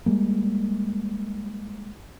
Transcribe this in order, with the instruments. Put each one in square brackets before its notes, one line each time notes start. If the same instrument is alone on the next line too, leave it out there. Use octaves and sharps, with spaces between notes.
[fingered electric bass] G3 G#3 A#3